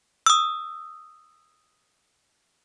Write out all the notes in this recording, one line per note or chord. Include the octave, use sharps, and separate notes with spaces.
D#6 E6